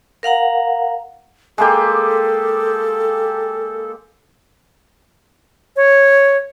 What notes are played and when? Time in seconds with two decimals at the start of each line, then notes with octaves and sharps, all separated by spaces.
0.23 A#4 F5 F#5 A#5
1.58 G#3 A#3 G4 A4
5.76 C#5